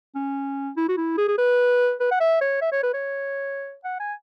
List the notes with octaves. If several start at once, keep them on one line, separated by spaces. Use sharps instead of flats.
C#4
E4
F#4
E4
G#4
G#4
B4
B4
F#5
E5
C#5
E5
C#5
B4
C#5
F#5
G#5